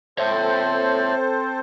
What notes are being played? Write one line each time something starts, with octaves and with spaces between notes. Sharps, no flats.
C4 A4 C5 C#5 E5